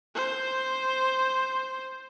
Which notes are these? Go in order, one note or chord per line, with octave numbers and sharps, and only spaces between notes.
C5